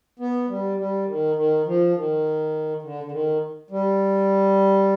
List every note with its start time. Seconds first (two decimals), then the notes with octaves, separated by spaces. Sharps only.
0.19 B3
0.48 G3
0.78 G3
1.07 D#3
1.36 D#3
1.66 F3
1.94 D#3
2.82 D3
3.04 D3
3.11 D#3
3.71 G3